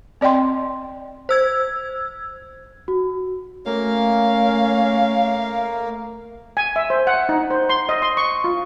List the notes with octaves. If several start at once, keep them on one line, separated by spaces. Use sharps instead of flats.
C4 D5 D#5 G5 C6
C5 E6 G#6
F#4
A3 A#3 C#4 A#4 F5
G#5
E5
C5
F#5
D#4
C5
C6
D#5
C6
C#6
F4